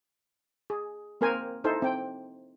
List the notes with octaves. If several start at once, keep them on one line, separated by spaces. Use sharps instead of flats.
G#4
A#3 C4 A#4 C5 G#5
D#4 E4 A4 C5
C4 G5